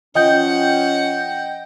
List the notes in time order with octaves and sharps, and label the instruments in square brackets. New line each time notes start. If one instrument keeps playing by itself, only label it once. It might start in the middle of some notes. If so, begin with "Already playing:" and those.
[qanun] F3 [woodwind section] C#4 [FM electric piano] D#5 G5 G6 [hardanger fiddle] F#5